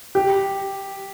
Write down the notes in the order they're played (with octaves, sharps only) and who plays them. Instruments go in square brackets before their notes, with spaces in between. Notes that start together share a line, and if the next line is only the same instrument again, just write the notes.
[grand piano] G4